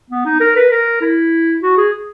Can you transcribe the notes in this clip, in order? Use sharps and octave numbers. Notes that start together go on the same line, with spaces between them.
B3
D#4
A#4
B4
A#4
E4
F#4
G#4